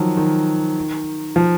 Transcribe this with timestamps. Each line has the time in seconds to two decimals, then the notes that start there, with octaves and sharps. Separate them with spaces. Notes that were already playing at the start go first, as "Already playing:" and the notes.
Already playing: D#3 F3 F#3
0.17 D#3
1.36 F3